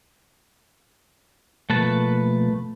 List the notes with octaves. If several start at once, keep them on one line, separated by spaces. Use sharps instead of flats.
B2 F3 A3 A#3 B4 A5